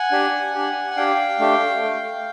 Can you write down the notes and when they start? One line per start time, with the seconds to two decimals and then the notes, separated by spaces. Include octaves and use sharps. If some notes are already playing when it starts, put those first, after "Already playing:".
Already playing: F#5 G#5
0.11 D4 G4
0.55 D4 G4
0.91 G#5
0.96 D4 G4 F5 G5
1.39 A3 D4 G4
1.82 A3